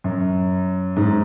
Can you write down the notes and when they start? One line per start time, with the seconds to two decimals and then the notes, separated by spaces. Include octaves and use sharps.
0.04 F#2
0.97 G#2